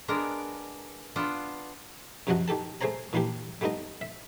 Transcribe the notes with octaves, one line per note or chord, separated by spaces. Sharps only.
G#3 B3 D4 A#4
B3 D4 F4
F#2 C3 F3 F#3 D#5 F#5
D#3 G4 A4 A5
A3 G#4 C5 C#5 A#5
A#2 E3 A#3 D4 G4
G3 A3 B3 D#4 D#5
E5